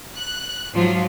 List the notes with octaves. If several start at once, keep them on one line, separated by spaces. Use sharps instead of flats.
F#6
G#2 F3 F#3 F4